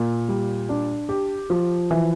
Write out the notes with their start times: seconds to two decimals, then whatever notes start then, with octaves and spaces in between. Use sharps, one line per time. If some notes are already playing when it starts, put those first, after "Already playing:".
Already playing: A#2
0.28 G3
0.69 D4
1.09 G4
1.50 F3
1.91 E3